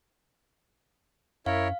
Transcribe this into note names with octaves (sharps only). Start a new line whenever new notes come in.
F#2 E4 A#4 C#5 F5